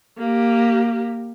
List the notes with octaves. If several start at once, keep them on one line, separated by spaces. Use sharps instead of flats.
A#3 G4